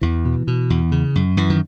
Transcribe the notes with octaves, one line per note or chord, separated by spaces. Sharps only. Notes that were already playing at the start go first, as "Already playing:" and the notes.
E2 E3
B2
B2
E2
C#3
F#2
F#2 E3
D#3